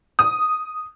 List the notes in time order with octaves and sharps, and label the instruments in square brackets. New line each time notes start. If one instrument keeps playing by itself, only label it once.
[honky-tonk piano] D#6